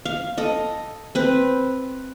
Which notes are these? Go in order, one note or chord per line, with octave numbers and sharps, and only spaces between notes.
F5
A4 D#5
C4 B4